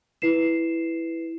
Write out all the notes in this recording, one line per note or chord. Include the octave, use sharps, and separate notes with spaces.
E4 B4 C7 E7